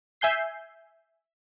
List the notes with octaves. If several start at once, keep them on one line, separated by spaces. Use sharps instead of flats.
E5 G#5 G6 C7